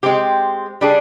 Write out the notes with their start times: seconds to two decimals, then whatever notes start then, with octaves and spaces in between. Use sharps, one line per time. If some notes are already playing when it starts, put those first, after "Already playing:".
0.03 G#3 C4 G4
0.81 G3 D4 G#4